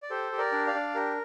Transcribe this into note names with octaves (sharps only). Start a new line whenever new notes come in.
D5
G4 A4 C5
G4
A#4 D5
D4
D5 F5
D4
G4 A#4